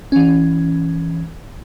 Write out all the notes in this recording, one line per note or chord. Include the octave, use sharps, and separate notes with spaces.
E3 C#4